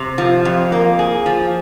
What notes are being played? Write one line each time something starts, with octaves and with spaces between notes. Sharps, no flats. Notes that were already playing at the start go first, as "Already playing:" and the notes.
Already playing: C3
F3
F2
A#3
G#4
F3